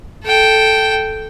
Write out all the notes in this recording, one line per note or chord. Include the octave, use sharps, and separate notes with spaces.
A4 G5